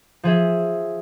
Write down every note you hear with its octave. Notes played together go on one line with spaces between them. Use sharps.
F3 G#4 E5